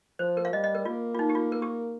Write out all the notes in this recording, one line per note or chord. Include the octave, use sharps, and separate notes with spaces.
F3 C5
A#4
F5
G3 D#5
D#5
A#4
A#3 F4
F4
D#4
G4
F4
A#4
G4